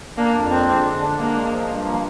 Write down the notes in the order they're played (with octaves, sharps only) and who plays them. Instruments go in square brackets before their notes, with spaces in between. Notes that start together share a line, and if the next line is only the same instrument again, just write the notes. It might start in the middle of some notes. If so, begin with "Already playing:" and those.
[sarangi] A#3 [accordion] D4
[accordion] F2
[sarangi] C4 [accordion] D4
[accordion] G#3
D3
D4
[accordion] G#3 [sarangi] A#3
[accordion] G#3
F3
G2
A#3